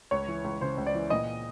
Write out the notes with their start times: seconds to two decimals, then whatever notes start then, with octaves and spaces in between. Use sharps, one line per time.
0.11 C#2 C#5
0.28 E3
0.44 C#2
0.61 C#3 C5
0.77 C#2
0.86 D5
0.94 E3
1.10 A#2 D#5